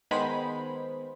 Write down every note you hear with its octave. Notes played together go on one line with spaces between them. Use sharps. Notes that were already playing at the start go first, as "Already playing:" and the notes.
D#3 G#3 B3 C5 B5